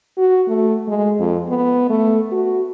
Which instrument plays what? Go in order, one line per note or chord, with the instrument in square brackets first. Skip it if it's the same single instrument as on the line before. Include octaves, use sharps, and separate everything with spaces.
[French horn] F#4
A3
G#3
F2
B3
A3
F#4